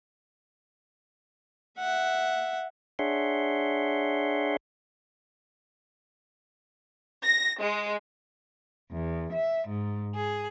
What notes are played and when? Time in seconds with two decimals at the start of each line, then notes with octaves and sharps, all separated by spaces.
1.79 E5 F#5
2.99 D4 G#4 C#5 E5 F#5 C6
7.25 A#6
7.60 G#3
8.92 E2
9.33 E5
9.68 G#2
10.15 G#4